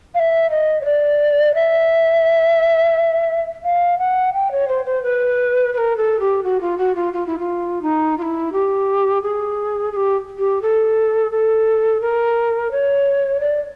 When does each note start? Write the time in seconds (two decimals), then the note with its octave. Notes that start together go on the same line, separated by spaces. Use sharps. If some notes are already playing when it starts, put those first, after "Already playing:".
0.14 F5
0.19 E5
0.50 D#5
0.81 C#5
0.85 D5
1.54 E5
3.63 F5
3.98 F#5
4.33 G5
4.51 C#5
4.68 C5
4.85 C5
5.02 B4
5.73 B4
5.77 A#4
5.96 A4
6.19 G4
6.43 F#4
6.60 F4
6.77 F#4
6.95 F4
7.12 F4
7.26 E4
7.38 F4
7.81 D#4
8.17 F4
8.22 E4
8.52 G4
9.21 G#4
9.91 G#4
9.96 G4
10.38 G4
10.61 A4
11.31 A4
12.01 A#4
12.71 C#5
13.40 D5